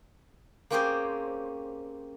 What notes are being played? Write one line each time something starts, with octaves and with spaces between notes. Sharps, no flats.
A#3 C4 C#4 G4 G#4 C5